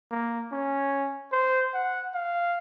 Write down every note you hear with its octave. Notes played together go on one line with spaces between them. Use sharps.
A#3
C#4
C5
F#5
F5